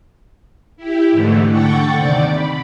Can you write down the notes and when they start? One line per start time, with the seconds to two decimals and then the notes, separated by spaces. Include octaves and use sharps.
0.77 E4 G4
1.11 G#2 D3 E3 A3
1.50 D3 F#5 G5 C#6 A6
1.94 D#2 C3 D5 D6
2.29 B5